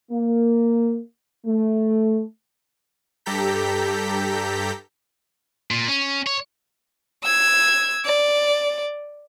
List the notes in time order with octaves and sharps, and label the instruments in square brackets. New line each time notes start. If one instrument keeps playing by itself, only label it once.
[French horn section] A#3
A3
[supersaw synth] G2 G4 A4 A#5 G6 B6
[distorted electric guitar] A#2
C#4
C#5
[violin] E6 G#6
D5